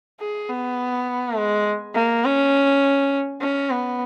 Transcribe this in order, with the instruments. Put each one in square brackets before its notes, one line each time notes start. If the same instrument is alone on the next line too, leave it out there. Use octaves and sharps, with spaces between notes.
[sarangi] G#4
B3
G#3
A#3
C#4
C#4
B3